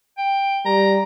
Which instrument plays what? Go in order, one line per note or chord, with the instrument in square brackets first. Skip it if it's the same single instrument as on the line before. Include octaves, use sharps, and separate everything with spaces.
[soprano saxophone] G5
[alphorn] G3 [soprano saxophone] A#5